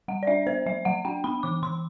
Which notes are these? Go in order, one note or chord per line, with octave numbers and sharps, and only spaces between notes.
G3 F#5
D5
D4 E5
B3 C5
F#3 E5
F#3 F#5
D4 G5
B3 B5
E3 D6
E3 C6